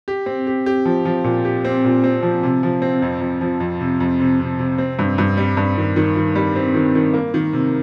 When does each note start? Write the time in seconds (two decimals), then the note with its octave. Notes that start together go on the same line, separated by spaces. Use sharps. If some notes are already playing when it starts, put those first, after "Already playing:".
0.08 G4
0.26 C4
0.47 G4
0.66 G4
0.85 F3
1.05 F3
1.24 A#2
1.45 G4
1.65 C4
1.84 A#2
2.04 C4
2.23 F3
2.43 C3
2.63 F3
2.82 C4
3.02 F2
3.21 F2
3.41 F3
3.60 F2
3.80 C3
4.00 F2
4.20 C3
4.40 C3
4.59 C3
4.78 C4
4.99 G2
5.18 G2
5.37 G3
5.57 G2
5.77 D#3
5.96 D#3
6.16 D#3
6.35 G3
6.56 C4
6.75 D#3
6.95 D#3
7.14 A#3
7.34 D#3
7.53 C3